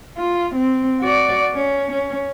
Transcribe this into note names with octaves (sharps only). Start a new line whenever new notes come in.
F4
C4
F#4 D5
C#4
C#4